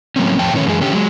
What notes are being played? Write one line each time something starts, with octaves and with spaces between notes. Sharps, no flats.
A2 F#3 A#3 C4 C#4
F2 A2 F3 C#5 G5 A5
A2 D#3 E3 C#4 C#5
F#2 E3 G#3 G4 G#4
D3 C#4 G4
F#3 G#3